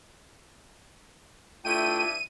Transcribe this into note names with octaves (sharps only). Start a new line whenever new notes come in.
G2 A3 D4 E4 F4 G5 D#7